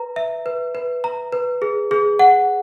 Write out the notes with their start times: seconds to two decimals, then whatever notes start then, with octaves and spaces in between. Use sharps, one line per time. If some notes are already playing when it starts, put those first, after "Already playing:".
Already playing: B4 A#5
0.16 E5
0.46 B4
0.75 B4
1.04 A#5
1.32 B4
1.62 G#4
1.91 G#4
2.19 F#5